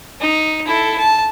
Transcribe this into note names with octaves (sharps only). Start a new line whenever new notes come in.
D#4
E4 A4
A5